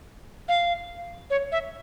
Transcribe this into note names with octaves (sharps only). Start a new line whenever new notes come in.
F5
C#5
E5